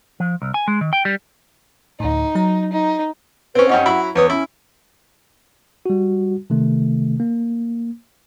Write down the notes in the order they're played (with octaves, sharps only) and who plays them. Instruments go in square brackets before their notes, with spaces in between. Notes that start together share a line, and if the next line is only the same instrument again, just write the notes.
[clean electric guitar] F3
C2
G#5
G#3
D#3
G5
G3
[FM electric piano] D2 A2 [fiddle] D#4
[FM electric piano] F#3 A#5
[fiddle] D#4
[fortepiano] C4 C#4 [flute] B4
[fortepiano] G2 C#4 D#4 [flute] F#5
[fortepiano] F#3 E4 B5
[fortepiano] E2 C#5 D#6 [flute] B4
[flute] C#4 [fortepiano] E4
[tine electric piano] G3 F#4
C3 D#3 A3
A#3